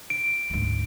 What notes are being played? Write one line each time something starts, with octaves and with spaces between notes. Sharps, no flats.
D7
D2 G#2